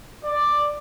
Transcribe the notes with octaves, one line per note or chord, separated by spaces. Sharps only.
D5